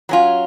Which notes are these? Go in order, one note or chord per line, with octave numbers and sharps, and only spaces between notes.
F#3 C#4 F4